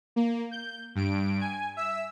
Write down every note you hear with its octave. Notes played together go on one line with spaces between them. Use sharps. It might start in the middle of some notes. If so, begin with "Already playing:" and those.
A#3
G6
G2 D7
G#5
E5 E6